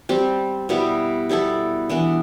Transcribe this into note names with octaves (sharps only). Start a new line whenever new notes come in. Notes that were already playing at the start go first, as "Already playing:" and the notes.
G3 C4 G4
B2 G3 B3 E4
G3 B3 E4 A4
E3 B3 D4